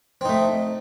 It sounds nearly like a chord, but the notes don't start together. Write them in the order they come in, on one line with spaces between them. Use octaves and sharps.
C4 D#4 A3